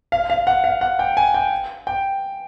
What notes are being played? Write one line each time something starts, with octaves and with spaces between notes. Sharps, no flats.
F5
F5
F#5
F5
F#5
G5
G#5
G5
G5